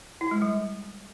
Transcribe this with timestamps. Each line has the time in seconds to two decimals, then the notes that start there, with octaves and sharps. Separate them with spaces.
0.21 E4
0.31 G#3
0.42 G3